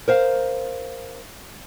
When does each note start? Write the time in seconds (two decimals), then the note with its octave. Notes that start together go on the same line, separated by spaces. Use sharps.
0.08 A#4 C5 F5